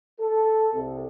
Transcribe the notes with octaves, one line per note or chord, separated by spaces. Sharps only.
A4
C2